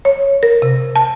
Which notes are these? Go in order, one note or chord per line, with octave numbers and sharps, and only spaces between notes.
C#5
A#4
C3
A5